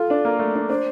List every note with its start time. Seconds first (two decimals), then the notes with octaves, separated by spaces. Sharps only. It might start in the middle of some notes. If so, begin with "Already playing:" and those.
Already playing: F4 A4
0.10 D4
0.25 A#3
0.39 A3
0.55 D4
0.70 D4 C5